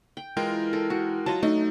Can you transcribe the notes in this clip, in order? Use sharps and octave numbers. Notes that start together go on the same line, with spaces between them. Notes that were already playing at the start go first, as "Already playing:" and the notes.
G5
E3 G#3 F4 A#4 G5
A4
F#4
F#3 F4 D#5 A5
A3 D4 D#4 D#5